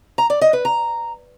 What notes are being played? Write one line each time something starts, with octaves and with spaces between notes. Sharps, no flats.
A#5
D5
D#5
B4
A#5